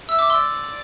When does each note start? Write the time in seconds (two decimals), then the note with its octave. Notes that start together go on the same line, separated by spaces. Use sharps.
0.08 E5 E6
0.19 D6
0.30 C6 E6
0.35 D5